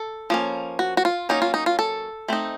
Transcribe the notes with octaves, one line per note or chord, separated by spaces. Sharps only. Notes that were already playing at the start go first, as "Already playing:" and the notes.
Already playing: A4
F3 A#3 C#4
F#4
F#4
F4
F#3 A#3 C#4 D#4
F4
D#4
F4
A4
A3 C4 D#4